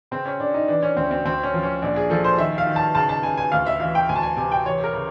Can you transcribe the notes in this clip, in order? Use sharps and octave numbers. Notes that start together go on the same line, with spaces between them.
C#3 C4
C#4
C#3 D4
D#4
E3 D4
C#4
D2 C4
C4
D2 C4
C#4
F3
C#4
A#1 D4
G#4
F3 A4
C5
D#3 E5
F5
D#3
A5
C#3 A5
A5
C#3 G#5
G#5
D2 F5
E5
E3 F5
G5
D2 G#5
A5
G#5
C3 G#5
G5
E3 C#5
A#4
C#3